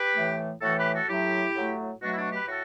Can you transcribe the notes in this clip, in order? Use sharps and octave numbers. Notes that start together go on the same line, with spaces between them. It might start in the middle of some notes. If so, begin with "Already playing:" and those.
Already playing: G4 B4
A2 E3 A3
A2 E3 A3 F#4 A4
G4 B4
F#4 A4
A2 F#3 A3 E4 G4
A2 F#3 A3
B2 F#3 A3 D4 F#4
E4
D4 F#4
G4 B4
A2 F#4 A4